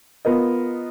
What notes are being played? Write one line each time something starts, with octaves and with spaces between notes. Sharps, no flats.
B3 F4 A#4 D#5